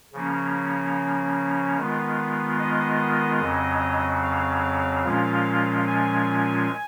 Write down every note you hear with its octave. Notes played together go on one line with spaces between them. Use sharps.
C#3 F3 A#3 C#4
D#3 G#3 B3 F4
D#5
F2 C#3 F#3
F5
A#2 F3 G#3 C#4 F4 F5
G#5